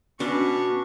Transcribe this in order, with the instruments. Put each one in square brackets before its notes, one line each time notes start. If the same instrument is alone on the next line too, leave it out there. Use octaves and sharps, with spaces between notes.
[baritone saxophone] B2 [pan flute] C#4 [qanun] D4 [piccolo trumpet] C#6